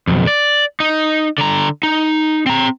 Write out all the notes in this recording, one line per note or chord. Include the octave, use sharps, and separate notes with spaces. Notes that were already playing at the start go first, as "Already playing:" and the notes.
B1 F2
D5
D#4
D3 A#5
D#4
C4 A#5